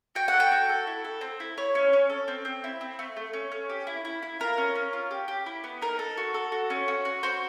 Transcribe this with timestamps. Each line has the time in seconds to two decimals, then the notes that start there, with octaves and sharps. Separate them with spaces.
0.15 F#4 G5
0.28 F#5
0.34 A4
0.40 G5
0.52 F#4
0.69 A4
0.87 E4
1.04 A4
1.21 C4
1.40 E4
1.57 E4 C#5
1.75 C#4
1.93 C#4
2.10 A4
2.28 C4
2.45 C4
2.64 E4
2.81 C4
2.99 A3
3.17 A3
3.33 C#4
3.52 C#4
3.70 G4
3.87 E4
4.05 E4
4.23 E4
4.40 F4 A#4
4.58 C#4
4.75 C#4
4.93 F4
5.11 G4
5.28 G4
5.46 E4
5.64 B3
5.82 D#4 A#4
5.99 A4
6.17 F#4
6.34 A4
6.52 F#4
6.70 C#4
6.88 F#4
7.05 F#4
7.23 F#4 C5